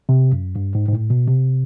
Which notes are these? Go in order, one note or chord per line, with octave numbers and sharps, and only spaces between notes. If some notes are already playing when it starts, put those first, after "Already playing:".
C3
F#2
G2
G#2
G#2
A2
B2
C3